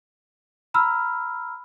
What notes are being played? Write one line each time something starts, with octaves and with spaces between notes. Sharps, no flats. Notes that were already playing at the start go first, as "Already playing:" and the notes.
A#5 B5 E6 F6